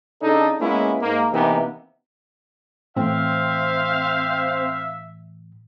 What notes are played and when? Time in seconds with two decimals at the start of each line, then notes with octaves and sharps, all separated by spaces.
0.22 C#3 D4 D#4 A4
0.60 G#3 A#3 B3 C#4 E4
1.02 G#2 A#3
1.32 C3 E3 A#3 B3 D#4
2.96 A2 E3 C4 C5 E5 F5